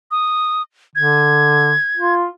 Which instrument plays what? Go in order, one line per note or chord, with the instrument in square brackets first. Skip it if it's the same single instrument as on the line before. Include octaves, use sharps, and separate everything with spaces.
[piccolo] D#6
[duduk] D3 [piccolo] G#6
[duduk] F4